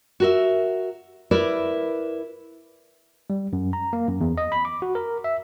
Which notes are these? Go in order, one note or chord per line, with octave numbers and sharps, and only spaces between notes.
F#4 A#4 E5
E4 A#4 B4 D5
G3
F#2
A#5
A#3
F#2
E2
D#5
B5
D6
F#4
A#4
E5